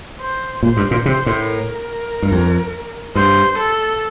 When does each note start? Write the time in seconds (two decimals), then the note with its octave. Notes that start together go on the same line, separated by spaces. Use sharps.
0.21 C5
0.63 A#2 C5
0.77 G2
0.91 A#2
1.06 C3 C5
1.26 A2
1.47 A#4
2.22 G2
2.32 F2
3.15 G2 C5
3.58 A4